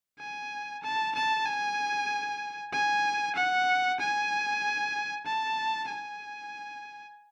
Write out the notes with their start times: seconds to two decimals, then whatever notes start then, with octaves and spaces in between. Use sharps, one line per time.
0.19 G#5
0.83 A5
1.15 A5
1.46 G#5
2.72 G#5
3.36 F#5
4.00 G#5
5.26 A5
5.89 G#5